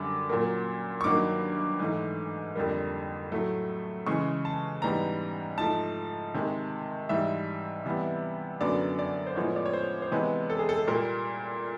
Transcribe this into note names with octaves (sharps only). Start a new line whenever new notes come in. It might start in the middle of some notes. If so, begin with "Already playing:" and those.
Already playing: F#2 D3 G3 D6
A#2 F#3 A#3
C#6
G2 D#3 F#3 A#3 D6
G#2 E3 A3
F2 D3 G3 A#3
A2 F#3 A3
C#3 E3 G#3 C#6
A5
G#2 E3 G3 B3 A#5
G#2 F3 A3 A5
C3 D#3 G#3
G#2 E3 G3 E5
C3 E3 G3 B3
F#2 D3 F#3 B3 D5
D5
C5
A2 F3 G#3 B3 C#5
D5
C#5
C5
C5
C3 E3 G#3 B3 B4
A4
G#4
A4
A#2 G3 A#3 A#4